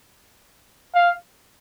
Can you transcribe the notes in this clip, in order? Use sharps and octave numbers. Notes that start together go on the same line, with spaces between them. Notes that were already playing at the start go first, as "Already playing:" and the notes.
F5